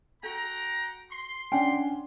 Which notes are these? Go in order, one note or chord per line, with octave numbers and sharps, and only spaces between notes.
F#4 A4 F#5 G5 A#5
C6
C#4 D4 F#5 G5